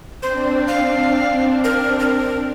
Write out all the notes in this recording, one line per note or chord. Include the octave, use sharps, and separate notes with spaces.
C4 D4 C5
F5
A#4
A#4